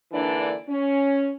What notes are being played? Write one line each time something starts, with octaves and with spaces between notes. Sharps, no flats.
G#2 D3 E3 A#3 D4 D5
C#4